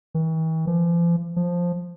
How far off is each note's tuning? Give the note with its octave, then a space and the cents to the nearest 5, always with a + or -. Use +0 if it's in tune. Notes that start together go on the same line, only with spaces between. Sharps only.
E3 -45
F3 -40
F3 +5